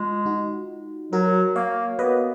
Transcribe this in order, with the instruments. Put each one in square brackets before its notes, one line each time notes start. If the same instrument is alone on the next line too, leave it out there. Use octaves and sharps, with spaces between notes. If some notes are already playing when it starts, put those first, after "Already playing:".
Already playing: [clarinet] G#3 [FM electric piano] F4
[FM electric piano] D#4 F#4
[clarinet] F#3 [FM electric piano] F#4 A#4
[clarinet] A#3 [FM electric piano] C#5 F5
[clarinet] B3 [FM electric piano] B4 D#5